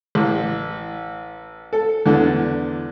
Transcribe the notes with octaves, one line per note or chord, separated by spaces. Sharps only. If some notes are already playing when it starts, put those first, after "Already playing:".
A1
A4
E2 D3